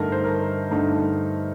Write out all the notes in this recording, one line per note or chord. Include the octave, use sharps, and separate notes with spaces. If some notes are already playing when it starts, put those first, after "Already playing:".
Already playing: G2 D3 A3 D#4 A#4
C5
A#4
G2 D3 A3 D#4